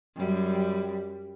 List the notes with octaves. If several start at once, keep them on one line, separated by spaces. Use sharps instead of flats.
F#2 G3